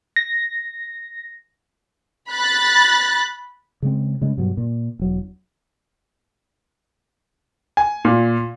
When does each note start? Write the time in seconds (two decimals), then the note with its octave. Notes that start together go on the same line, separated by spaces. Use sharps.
0.16 A#6
2.31 B5 F#6 A6
3.82 C#3 G#3 C4
4.22 C#3 G#3
4.38 G2 B2 F#3
4.57 A#2
4.99 E1 F#3
7.77 G#5
8.05 A#2